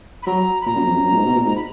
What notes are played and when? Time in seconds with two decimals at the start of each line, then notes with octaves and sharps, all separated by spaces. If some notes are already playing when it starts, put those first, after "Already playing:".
0.23 B5
0.27 F#3 A#5
0.61 B5
0.66 A#2 A#5
0.76 F#2
0.86 F2
0.96 F#2
1.06 F#2
1.12 A#2
1.16 G#2
1.26 B2
1.36 A#2
1.46 G#2 A#5
1.56 B5